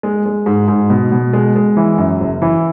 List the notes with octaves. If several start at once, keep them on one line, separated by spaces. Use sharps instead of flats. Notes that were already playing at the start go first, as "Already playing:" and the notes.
G#3
G#3
G#2
G#2
B2
B2
G#3
G#3
E3
F#2
F#1
E3